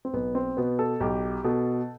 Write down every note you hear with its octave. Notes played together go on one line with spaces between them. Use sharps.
C4
B1 B3
C4
B2 B3
A4
B1 G4
B2 A4